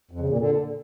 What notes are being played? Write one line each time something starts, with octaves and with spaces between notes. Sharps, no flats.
F2
C#3
A#2
D3